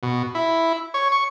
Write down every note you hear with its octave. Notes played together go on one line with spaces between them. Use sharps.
B2
E4
C#5
C#6